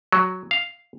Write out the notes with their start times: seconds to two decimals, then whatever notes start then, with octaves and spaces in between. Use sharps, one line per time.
0.12 F#3
0.51 F5